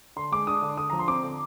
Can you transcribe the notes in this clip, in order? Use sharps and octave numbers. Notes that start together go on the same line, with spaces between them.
D3 C6
G#3 D6
D4 D#6
D3
D3 D#6
F3 A#5
C6
C4 D6
D3